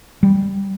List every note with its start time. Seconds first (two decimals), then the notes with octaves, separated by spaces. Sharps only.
0.23 G3